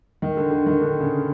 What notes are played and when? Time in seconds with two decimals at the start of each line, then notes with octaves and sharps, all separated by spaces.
0.22 D#3
0.37 D3
0.51 D3
0.66 D#3
0.81 D3
1.00 C#3